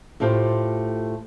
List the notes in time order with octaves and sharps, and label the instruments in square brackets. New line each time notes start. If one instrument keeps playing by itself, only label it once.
[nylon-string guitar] A2 A3 F4 G4 C5